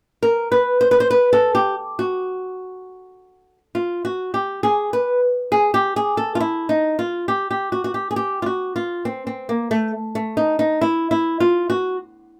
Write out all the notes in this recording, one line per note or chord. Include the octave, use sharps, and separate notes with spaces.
A#4
B4
C5
B4
C5
B4
A4
G4
F#4
F4
F#4
G4
G#4
B4
G#4
G4
G#4
A4
F4
E4
D#4
F4
G4
G4
F#4
F#4
G4
G#4
G4
F4
F#4
F4
C4
C4
A#3
A3
A3
D#4
D#4
E4
E4
F4
F#4